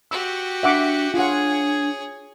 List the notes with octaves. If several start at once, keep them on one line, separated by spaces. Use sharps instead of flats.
F#4 G4 E6
D4 E5 F#5 D6
D4 F4 G#4 C#5 F#5